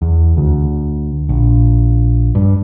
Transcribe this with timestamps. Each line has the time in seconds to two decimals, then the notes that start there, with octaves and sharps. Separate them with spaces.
0.02 E2
0.37 D2
1.29 A#1
2.35 G2